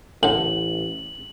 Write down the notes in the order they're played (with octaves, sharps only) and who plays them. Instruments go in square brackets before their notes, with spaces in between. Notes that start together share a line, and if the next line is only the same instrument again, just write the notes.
[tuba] A1 [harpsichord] A2 D3 [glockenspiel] F#7